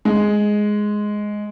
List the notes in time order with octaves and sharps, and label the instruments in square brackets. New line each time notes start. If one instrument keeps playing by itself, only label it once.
[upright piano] G#3